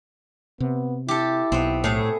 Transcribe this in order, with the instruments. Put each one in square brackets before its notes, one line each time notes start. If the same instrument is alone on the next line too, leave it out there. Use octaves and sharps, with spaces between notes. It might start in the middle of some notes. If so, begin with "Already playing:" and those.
[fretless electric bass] C3 [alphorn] B3
[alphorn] E4 [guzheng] G4 A4
[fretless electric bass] B1 [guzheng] B3 C4
[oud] A2 [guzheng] A3 G#4